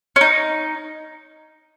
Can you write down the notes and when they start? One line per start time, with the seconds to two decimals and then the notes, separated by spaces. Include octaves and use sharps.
0.16 C#4
0.21 D#4